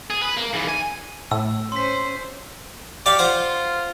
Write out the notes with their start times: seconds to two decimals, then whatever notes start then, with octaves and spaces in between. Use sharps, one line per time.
0.10 G#4
0.22 B4
0.37 A#3
0.54 G#2 E3
0.69 G#5
1.31 A2 E6
1.72 C#4 C5 C6 B6
3.06 G4 D5 F5 C#6
3.19 F4 C5 F#5